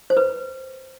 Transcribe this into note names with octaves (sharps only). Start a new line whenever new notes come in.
C5
B4